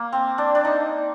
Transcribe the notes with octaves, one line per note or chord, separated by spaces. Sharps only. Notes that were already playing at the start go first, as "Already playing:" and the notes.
Already playing: A#3
C4
D4
D4
D#4